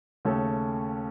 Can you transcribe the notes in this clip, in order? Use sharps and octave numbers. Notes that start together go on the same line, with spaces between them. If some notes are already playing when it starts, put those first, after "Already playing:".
D#2 C#3 A3 C#4 A4